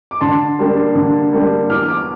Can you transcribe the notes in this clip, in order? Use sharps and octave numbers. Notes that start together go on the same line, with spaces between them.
D6
D3 A5 C6
G3 A#3 D4
D3
G3 A#3 D4
E2 D6 F6
D6 F6